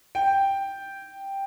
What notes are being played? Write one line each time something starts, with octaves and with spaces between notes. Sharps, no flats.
G5